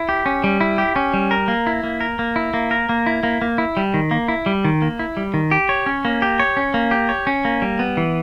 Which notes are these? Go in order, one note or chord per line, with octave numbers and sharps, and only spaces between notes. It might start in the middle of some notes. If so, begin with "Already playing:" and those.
Already playing: E4
G4
C#4
G3
E4
G4
C#4
G3
A#4
A#3
E4
A#3
A#4
A#3
E4
A#3
A#4
A#3
E4
A#3
A#3
E4
G3
D#3
A#3
E4
G3
D#3
A#3
E4
G3
D#3
G4
C#5
C#4
A#3
G4
C#5
C#4
A#3
G4
C#5
C#4
A#3
G3
B3
E3